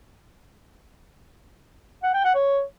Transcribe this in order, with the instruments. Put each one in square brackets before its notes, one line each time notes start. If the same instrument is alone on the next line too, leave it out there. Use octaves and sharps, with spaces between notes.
[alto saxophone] F#5
G5
F#5
C#5